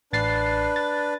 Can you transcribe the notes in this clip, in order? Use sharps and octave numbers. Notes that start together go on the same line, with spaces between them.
A1 D4 B4 A6 C7
A6